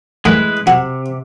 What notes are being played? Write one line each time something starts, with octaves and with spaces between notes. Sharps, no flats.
A2 E3 G#3 E4 B4
C3 F#4